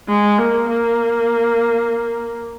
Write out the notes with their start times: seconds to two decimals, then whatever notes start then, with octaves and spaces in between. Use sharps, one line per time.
0.08 G#3
0.38 A#3
0.69 A#3